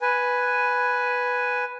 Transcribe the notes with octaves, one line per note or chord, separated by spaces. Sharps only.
B4 G#5